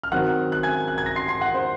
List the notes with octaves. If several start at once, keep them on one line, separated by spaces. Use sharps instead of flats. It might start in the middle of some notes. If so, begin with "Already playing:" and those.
F6
D#3 F#3 C4 F#5 F#6
F#6
G#5 G#6
F#6
G#6
A#6
C6 C7
C6 C7
F#5 F#6
C5 C6